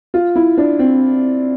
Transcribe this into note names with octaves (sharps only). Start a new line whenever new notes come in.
F4
E4
D4
C4